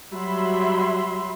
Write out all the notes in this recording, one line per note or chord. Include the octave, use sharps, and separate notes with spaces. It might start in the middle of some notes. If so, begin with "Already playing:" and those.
F#3 G3 E5 B5 C6